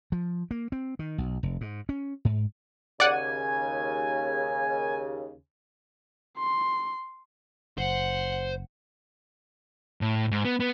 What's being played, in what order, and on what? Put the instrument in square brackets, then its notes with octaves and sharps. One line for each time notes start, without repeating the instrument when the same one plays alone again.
[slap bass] F3
A#3
C4
D#3
B1
F1
G#2
C#4
G#2
[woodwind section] D#2 C#3 [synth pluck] D5 F#5 [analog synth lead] G#5
[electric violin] C6
[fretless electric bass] F#1 [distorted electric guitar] C5 [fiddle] F#5
[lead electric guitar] A2
G#2
B3
B3